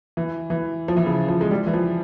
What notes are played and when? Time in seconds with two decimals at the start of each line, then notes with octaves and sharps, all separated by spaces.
0.17 E3
0.50 E3
0.88 F3
0.97 E3
1.06 C#3
1.28 F3
1.41 G#3
1.51 G3
1.67 E3
1.73 F3